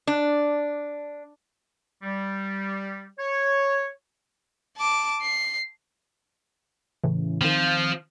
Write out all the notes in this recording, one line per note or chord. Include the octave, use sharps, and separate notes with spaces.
D4
G3
C#5
A5 D6
C7
A2 C#3 E3
D#3 F3 C4